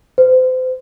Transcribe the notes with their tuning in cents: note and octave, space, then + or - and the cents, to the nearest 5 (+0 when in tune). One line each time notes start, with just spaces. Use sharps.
C5 -35